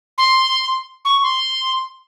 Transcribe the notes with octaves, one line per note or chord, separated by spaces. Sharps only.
C6
C#6
C6